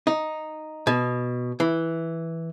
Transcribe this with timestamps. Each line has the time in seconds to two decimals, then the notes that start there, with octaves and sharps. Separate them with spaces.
0.07 D#4
0.87 B2
1.60 E3